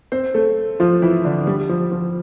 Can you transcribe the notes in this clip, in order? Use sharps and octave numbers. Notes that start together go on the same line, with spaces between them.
C4 C5
A3 A4
F3 F4
E3 E4
D3 D4
G3
F3
F3